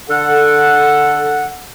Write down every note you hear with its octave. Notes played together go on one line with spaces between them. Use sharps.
D3 A4 F#5